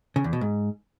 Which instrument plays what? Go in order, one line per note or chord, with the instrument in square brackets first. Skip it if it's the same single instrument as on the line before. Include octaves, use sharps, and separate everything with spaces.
[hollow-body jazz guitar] C#3
E2
B2
G#2